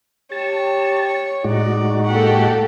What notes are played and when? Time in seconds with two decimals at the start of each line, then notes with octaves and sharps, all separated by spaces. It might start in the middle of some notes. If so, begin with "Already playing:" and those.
0.32 G4 C#5 A5
1.06 C#5
1.44 A2 G#3 D#4 F#4 D5
2.08 A#3 G4 A4 F#5